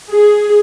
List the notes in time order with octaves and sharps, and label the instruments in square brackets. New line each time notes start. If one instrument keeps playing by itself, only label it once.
[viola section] G#4